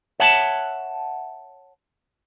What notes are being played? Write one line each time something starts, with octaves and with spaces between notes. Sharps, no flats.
C#5 E5 F#5 A5